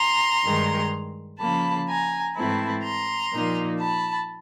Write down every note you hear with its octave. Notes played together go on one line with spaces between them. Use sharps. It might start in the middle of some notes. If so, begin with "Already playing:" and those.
Already playing: A#5 C6
G2 D#3 G#3
C#3 F3 A#3 A5 B5
G#5 A#5
G#2 E3 A3 C4 E4 A5 B5
A#5 C6
A#2 F3 A#3 D#4
A5 B5